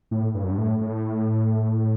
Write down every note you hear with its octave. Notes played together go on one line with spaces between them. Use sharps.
A2
G2
F#2
G2
A2
A2